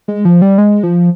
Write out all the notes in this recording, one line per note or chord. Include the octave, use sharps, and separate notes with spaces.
G#3
F3
G3
G#3
F3